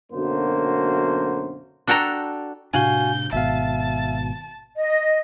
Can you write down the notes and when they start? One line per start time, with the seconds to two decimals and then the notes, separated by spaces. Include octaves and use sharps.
0.13 B1 F#2 D3 A#3 F#4 C5
1.87 D4 F#4 A4 G5 A#5
2.74 A2 C3 D4 F#4 F5 G#5 G6
3.33 G#1 B2 E5 F5 A5
4.77 D#5